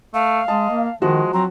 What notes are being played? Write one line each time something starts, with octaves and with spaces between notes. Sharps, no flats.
A3 F5
G#3 D#5 A5
A#3
D#3 F3 G#3 F#4
F#3 C4 A#5